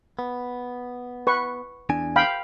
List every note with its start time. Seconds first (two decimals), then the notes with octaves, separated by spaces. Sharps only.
0.19 B3
1.27 B4 C#6
1.89 E2 D4 G#5
2.16 F5 G5 B5